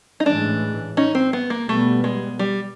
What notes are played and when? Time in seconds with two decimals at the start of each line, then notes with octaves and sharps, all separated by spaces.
0.20 D#4
0.26 A2 E3 G#3 C#4 D4
0.97 C#4 D#4
1.15 C4
1.33 B3
1.50 A#3
1.69 B2 G3 A3 B3
2.04 G#3
2.39 G3